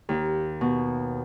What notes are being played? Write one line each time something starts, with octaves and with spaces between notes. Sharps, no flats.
D#2
B2